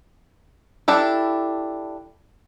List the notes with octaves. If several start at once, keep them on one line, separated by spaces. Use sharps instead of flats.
D4 E4 G4 A4